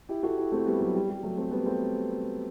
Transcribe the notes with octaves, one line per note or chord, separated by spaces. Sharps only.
E4 G4
F#4 A4
E4 G4
A3 C4
G3 B3
F#3 A3
G3
G3
F#3 A3
A3 C4
G3 B3
A3 C4